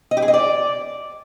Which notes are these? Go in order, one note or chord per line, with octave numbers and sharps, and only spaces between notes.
D#5
G4
G#4
D#5
D5